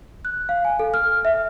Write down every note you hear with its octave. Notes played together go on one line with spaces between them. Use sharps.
F#6
F5
G#5
A4
F6
E5